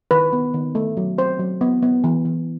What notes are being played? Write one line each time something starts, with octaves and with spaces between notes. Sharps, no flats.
D#3 B4
B3
D#3
A3
F#3
C4 C5
F#3
B3
B3
E3
E3